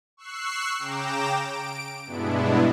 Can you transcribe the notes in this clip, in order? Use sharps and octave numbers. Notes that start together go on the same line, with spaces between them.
C#6 E6 F#6 C7
C#3 G5 A#5 D6 E7
D7
G2 B2 G#3 B3 D4 E4